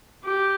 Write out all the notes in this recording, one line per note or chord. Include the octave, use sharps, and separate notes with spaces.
G4